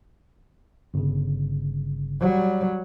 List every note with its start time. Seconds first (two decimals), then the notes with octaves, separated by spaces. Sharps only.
0.94 G1 C#3
2.21 F#3 G3